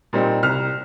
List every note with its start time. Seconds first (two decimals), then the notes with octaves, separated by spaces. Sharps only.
0.13 A#2 G3 C4 D#4
0.42 C2 F6